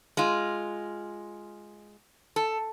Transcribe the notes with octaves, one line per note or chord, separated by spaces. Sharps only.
G#3 F4
A4